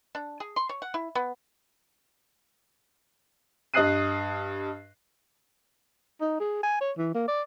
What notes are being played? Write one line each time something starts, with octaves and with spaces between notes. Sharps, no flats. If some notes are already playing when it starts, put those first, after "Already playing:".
D4
G#4
C6
C#5
F#5
E4
B3
G2 D#5 D#6 F#6 C7 D#7
D#4
G#4
G#5
C#5
E3
A#3
D5